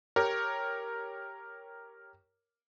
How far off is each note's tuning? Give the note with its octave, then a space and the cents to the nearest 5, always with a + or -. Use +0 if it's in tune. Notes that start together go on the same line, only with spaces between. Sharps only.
G4 +0 A#4 +0 C#5 +0